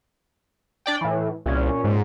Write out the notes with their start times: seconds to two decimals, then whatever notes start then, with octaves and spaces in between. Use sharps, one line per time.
0.86 D4 D5 G5
1.01 A2 E3
1.46 C2 A#2 C#4
1.84 G#2